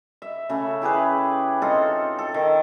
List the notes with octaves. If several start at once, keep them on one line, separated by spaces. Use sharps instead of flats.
E5
C#3 A3 E5
E4 G4 G#4 B4
C4 D#4 F4 A4
A4
D#3